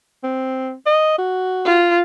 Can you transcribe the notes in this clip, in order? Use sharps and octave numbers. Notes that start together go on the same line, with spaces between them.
C4
D#5
F#4
F4